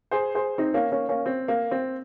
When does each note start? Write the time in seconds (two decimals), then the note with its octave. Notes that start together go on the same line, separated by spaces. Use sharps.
0.11 G#4 C5
0.35 G#4 C5
0.58 C4 D#4
0.74 A#3 C#4
0.92 A#3 C#4
1.09 A#3 C#4
1.26 C4
1.48 A#3
1.71 C4